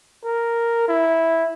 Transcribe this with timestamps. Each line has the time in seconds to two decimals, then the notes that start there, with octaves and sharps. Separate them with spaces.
0.24 A#4
0.88 E4